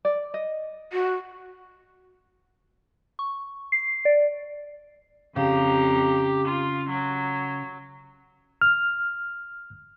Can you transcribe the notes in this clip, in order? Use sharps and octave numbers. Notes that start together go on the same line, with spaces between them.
D5
D#5
F#4
C#6
C7
D5
F2 C#3 G4 A#5
F4
F#3
F6